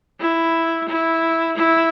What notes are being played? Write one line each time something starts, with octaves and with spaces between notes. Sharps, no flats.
E4
E4
E4